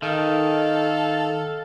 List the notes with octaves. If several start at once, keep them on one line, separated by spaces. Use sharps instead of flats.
D#3 A4 F5